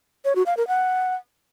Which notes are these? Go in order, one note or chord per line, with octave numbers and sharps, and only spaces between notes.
C#5
F#4
F5
A#4
F#5